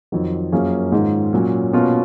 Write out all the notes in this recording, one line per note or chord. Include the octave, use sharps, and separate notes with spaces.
F2 D#3 F#3
F#2 F3 A#3 C#4 G#4
G#2 D#3 G#3 C#4 F4
A#2 F#3 C#4
B2 A#3 C#4 F4